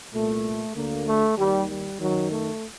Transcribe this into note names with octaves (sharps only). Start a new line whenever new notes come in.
C2 A#2 A3
D2 D3 A#3
A3
D#2 D#3 G3
G3
F#2 D#3 F#3
A3